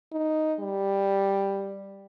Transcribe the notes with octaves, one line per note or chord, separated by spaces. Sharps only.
D#4
G3